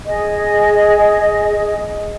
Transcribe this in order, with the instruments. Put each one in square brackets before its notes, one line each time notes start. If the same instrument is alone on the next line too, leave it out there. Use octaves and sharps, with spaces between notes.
[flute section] G#4 D#5